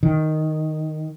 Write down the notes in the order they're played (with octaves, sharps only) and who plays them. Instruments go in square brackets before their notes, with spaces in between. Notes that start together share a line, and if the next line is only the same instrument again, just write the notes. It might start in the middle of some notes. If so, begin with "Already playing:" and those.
[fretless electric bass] D#3